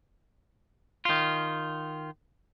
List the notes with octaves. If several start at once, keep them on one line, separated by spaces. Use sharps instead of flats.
D#3 F4